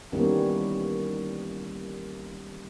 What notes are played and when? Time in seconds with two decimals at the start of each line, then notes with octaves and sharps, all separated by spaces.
0.12 D#3 E3 G3 A#3 B3 C#4